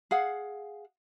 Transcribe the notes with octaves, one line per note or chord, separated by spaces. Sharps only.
G#4 F5 F#5